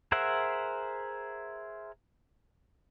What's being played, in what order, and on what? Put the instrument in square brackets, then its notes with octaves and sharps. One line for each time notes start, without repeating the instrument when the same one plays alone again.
[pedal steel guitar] G#4 A#4 C5 E5 F#5